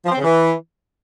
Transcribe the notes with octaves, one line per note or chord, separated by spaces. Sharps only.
F3
C4
C#3
E3